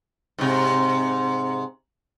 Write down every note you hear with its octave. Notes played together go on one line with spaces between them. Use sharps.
G#2 C3